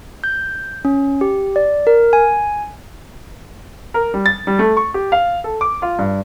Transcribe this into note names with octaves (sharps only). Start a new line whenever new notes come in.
G6
C#4
G4
D5
A#4
G#5
A#4
G3
A6
G3
A3
C#6
G4
F5
A4
D6
F4
G2